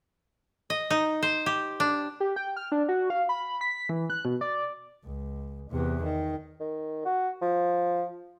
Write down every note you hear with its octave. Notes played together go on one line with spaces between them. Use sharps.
D#5
D#4
C5
G4
D4
G4
G5
F6
D4
F#4
F5
B5
B6
E3
F#6
B2
D5
C#2
E2 C3
D#3
D#3
F#4
F3